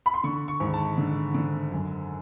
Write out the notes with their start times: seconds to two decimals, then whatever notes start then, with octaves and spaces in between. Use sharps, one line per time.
0.06 B5
0.14 C6
0.23 D3 C#6
0.48 C#6
0.60 G#1
0.74 A5
0.97 D3
1.34 D3
1.72 F#2